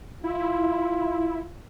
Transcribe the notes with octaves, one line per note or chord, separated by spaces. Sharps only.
E4 F4